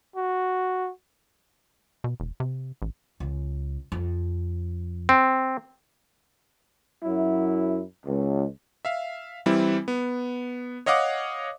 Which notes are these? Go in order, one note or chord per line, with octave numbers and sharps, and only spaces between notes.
F#4
B2
E1
C3
A1
C#2
F2
C4
F#2 F#3 E4
C#2
E5 F5
E3 G3 C4 E4
B3
C#5 D#5 F5 F#5 D6 D#6